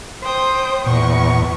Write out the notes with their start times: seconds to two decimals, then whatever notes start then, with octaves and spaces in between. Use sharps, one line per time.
0.22 C5 G5 D#6
0.87 E2 A#2 C#6